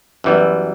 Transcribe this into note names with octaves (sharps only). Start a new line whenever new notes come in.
F#2 E3 G3 B3